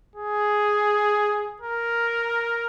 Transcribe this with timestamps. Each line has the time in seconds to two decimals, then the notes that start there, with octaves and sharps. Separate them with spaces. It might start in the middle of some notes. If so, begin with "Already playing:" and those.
0.16 G#4
1.61 A#4